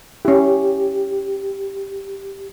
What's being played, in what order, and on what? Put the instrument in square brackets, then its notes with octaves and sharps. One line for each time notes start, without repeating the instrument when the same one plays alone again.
[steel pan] C#4 E4 [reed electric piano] G4